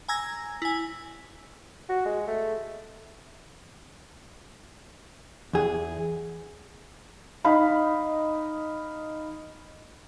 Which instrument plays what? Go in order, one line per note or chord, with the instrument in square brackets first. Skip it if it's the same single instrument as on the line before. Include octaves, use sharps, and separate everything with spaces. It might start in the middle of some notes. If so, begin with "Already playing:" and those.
[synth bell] G#5 A#5 E6 G#6 A#6
E4 G#5
[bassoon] F#4
G#3
A3
[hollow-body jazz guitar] E2 G#4
[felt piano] D#4 D#5 F5 B5